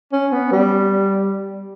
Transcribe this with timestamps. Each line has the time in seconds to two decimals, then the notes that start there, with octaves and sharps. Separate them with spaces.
0.12 C#4
0.32 B3
0.52 G3